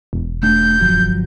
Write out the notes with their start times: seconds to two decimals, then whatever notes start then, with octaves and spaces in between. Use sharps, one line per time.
0.13 E1
0.43 A3 D4 G6
0.80 G1 F3 F#3